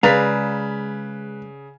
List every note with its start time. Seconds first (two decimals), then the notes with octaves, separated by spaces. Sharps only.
0.03 C#3 G#3 G#4 B4 D5 F5 A#5 B6